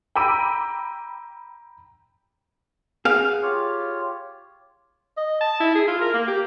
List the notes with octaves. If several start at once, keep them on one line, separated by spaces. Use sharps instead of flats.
G5 A#5 B5 D6 E6 D#7
G#4 F5 F#5
F4 G4 C#5
D#5
A5
E4
G#4
F4
A#4
A#3
G4